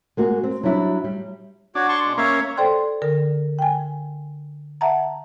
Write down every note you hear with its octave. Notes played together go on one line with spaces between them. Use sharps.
G#3 A#3 F#4
C4
F#3 G3 D4 E4
G3
D4 F#4 C#5
A5 C6 C#6
B2 G#3
A#3 C#4 C#5 E5 F5
A4 C5 D5 G5 C6
D3 A#4
G5 G#5
E5 F#5 A5 A#5